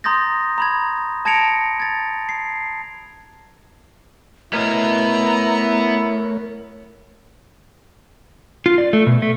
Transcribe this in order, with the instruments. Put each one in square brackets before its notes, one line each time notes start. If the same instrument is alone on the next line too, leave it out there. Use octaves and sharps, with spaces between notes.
[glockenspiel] A#5 C6 D#6 G6 A6 A#6
A#5 B5 G#6
A5 G#6 A#6 C#7 D7 F7
G#6 A6
C7
[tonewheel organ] A3 A#4 C#5 [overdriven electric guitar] B3 D#5 [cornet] E4 [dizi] A#5
[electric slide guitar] F4
D5
A3
B2
A3